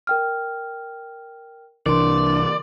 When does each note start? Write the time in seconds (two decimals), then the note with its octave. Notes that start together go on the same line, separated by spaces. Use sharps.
0.07 A#4 G5 F6
1.86 C2 E3 D4 A#4 D5 C6